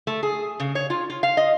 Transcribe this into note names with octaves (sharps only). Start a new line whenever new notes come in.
A3
G#4
C#3
C#5
F4
F4
F5
D#5